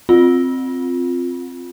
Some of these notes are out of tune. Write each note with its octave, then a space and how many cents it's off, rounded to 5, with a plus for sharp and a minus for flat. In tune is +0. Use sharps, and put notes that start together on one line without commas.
C4 +0 F4 +5